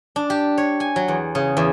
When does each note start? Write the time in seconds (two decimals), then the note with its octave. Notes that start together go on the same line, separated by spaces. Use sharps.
0.16 D4
0.30 G4
0.58 C#5
0.80 G#5
0.96 F#3
1.08 E2
1.35 C#3
1.57 E2